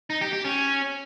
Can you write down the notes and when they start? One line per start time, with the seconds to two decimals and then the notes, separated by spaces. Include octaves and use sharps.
0.10 D#4
0.21 G4
0.33 G4
0.44 C#4